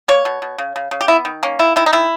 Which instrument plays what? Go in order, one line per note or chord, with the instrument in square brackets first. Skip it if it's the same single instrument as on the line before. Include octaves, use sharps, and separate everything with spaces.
[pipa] A#3 C#5
B2
B2
C#3
C#3
C#3
G4
B3 E4
D#3
A#3 C#4
D#3 E4
D#3 E4
D#4
D#3 E4